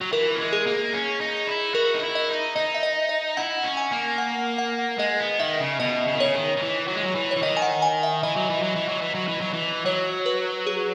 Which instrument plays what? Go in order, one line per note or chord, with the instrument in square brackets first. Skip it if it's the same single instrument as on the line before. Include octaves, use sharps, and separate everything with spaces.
[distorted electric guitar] F#3
[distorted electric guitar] E3 [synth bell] A#4
[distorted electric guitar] A#3
G#3
[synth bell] G#4
[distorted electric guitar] A#3
C#4
D#4
E4
[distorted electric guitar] F#4 [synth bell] A#4
[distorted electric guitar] D#4
E4
[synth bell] D#5
[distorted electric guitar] D#4
[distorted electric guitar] D#4 [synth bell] D#5
[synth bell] E5
D#5
D#5
[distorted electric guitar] E4 [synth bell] F#5
[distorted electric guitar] C#4
[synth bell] G#5
[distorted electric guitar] A#3
[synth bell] F#5
F#5
[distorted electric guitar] G#3 [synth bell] D#5
[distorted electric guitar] B3
[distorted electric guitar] D#3 [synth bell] E5
[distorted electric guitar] C#3
[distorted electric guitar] B2 [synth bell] D#5
[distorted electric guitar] C#3
D#3
[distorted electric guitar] C#3 [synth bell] C#5
[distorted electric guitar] D#3
D#3
E3
F#3
G#3
F#3
E3
[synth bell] C#5
[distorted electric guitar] E3
[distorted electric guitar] D#3 [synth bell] D#5
[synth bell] G#5
F#5
G#5
E5
[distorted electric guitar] E3 [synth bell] D#5
[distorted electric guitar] F#3
E3
F#3
E3
F#3
E3
F#3
E3
F#3
E3
[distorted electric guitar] F#3 [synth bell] C#5
[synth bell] B4
G#4